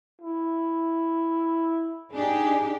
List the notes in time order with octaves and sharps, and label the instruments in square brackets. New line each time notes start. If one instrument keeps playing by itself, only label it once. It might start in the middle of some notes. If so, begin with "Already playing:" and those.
[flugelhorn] E4
[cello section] D4 D#4 G4 [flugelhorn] G#4